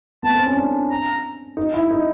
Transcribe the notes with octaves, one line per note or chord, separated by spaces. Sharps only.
B3 A5
C4
C#4
D4
A#5
D#4
E4
D#4